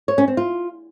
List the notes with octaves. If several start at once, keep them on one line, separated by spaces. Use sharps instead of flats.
C#5
C#4
C4
F4